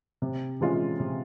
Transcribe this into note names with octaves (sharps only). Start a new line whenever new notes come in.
C3
E3 G#3 C#4 F4
C3